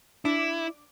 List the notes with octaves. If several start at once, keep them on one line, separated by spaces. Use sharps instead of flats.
D4 E4 D6